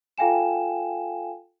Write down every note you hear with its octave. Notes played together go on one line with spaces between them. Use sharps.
F4 A4 F5 G5 G#5 E7